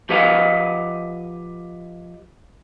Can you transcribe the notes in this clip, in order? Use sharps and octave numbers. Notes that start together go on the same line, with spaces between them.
F3 G4 B4 D#5 F5